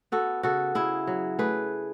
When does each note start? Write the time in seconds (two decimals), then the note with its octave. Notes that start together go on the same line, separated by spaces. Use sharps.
0.12 B3 F#4 A4
0.43 C#3 F#4 A4
0.75 C#3 E4 G#4
1.07 F#3
1.39 A3 G#4 B4